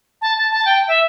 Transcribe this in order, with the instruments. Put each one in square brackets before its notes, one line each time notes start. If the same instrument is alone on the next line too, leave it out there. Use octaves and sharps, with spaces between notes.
[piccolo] A5
A5
A5
G5
E5